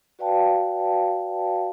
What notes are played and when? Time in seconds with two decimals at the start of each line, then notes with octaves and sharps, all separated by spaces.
0.19 F#4 B4 D5 F5 G5 A5